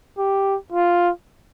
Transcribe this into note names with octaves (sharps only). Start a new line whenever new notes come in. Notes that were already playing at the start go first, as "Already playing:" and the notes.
G4
F4